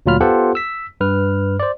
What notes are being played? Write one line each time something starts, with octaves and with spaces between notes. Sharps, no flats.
D2 A#2 F#3 F4 B5 F6
B3 F4 G4 A4 C5 F#5
E6 B6
G2 B4 F6
C5 D5